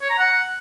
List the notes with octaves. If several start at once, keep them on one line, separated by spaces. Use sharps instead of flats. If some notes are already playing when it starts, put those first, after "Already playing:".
C#5
A#5
F#5